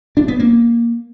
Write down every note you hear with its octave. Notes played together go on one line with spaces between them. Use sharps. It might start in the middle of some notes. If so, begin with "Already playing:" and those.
D4
B3
A#3